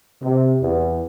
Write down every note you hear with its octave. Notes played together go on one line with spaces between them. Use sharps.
C3
E2